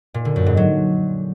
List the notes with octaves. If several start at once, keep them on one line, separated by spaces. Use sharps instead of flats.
A#2
D3
F#2
G#2
F#3